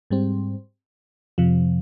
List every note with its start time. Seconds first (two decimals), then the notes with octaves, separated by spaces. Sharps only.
0.10 G#2 G3 C4
1.38 F2 C3 F3